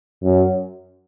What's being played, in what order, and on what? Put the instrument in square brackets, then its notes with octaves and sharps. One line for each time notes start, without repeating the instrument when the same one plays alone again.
[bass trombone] F#2